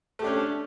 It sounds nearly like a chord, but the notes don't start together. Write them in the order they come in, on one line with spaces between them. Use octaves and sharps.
A3 G4 D4 C#4